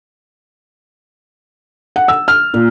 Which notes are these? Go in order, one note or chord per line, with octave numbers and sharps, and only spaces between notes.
F#5
E6
F6
A#2